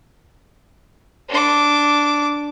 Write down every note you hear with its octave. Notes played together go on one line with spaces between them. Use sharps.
D4 D6